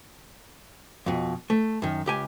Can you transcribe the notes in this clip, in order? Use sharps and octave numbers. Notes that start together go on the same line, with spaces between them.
F2 B2
A3
F#2 D#3
C#2 G4 G#5